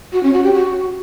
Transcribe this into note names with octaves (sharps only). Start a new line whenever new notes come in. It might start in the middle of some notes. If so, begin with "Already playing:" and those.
F#4
C#4
F#4
G4
F#4